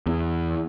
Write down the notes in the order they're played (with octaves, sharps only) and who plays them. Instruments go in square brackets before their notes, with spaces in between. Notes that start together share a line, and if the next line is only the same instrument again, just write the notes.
[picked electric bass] E2